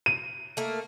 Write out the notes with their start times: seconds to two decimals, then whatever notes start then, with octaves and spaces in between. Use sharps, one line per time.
0.06 D#7
0.57 A3 A#3